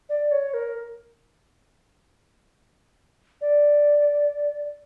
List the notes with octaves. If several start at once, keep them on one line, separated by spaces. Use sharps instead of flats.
D5
C#5
A#4
D5